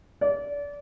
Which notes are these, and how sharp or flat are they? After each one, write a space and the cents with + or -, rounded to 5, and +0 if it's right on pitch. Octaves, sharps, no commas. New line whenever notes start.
D5 -30